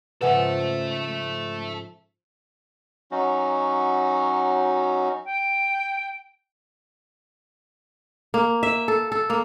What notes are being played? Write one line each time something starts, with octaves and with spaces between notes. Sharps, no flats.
G#2 C#3 F3 A4 B4 E5 F#5 G#5
F#3 C#4 D#4 F#4
G5
A#3
E5
A4
A4
A#3